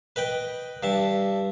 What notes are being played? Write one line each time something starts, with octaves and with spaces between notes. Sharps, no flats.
B4 D#5 G5 B5
G2 E5 A5